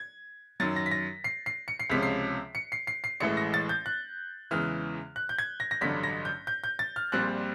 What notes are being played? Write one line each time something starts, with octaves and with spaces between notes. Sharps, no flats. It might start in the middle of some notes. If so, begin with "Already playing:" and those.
Already playing: G#6
F#2 D#3 F#3 A6
A#6
B6
A#6
C7
C7
C#7
C7
C#2 C3 F3 G#3 C#4 B6
C7
C#7
C7
C7
C7
A1 A2 E3 G#3 C#7
A#6
A6
G6
F#6
E2 C#3 E3 G#3 F6
F#6
G6
G#6
A#6
A#6
A1 G2 D3 F#3 B6
A#6
G6
G6
G6
A6
F6
A#1 A#2 G3 C4 F#6